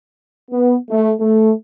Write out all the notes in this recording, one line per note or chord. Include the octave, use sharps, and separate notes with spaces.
B3
A3
A3